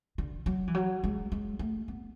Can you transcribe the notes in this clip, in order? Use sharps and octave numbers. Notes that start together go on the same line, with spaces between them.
D3
F#3
E3
F#3
G#3
G#3
A3
B3